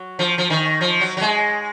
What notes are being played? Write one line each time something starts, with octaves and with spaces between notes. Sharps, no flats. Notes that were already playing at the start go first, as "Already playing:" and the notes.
Already playing: F#3
F3
F3
D#3
F3
F#3
F#3
G#3